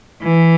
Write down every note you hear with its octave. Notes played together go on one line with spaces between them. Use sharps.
E3